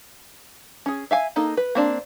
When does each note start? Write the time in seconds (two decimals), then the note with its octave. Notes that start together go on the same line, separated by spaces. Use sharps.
0.86 C#4 G#4
1.11 E5 F5 G#5
1.36 A#3 D#4 A4
1.57 B4
1.75 A#3 C4 D4